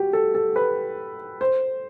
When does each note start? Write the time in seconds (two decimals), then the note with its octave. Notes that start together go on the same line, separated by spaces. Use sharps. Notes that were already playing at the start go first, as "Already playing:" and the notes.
Already playing: F#4 G4
0.13 A4
0.35 A4
0.56 B4
1.41 C5